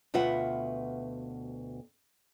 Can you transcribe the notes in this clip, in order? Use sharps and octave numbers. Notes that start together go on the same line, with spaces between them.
D2 B2 F4 B4 E5 F#5